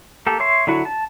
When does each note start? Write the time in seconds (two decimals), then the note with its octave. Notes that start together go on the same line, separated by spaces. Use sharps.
0.27 A#3 G4 A4
0.40 C#5 E5 C6
0.67 D3 F#3 E4 F#4
0.85 A5